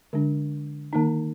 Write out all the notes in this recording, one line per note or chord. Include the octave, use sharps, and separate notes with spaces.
D3 G#3 D4
D#3 A#3 D#4